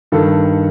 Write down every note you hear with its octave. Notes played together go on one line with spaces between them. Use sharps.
G2 D#3 A4